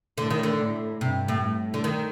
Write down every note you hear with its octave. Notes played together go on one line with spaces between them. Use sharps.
A2 D3
D#3
D3
A2
G2 C3
A2
A2
D3
D#3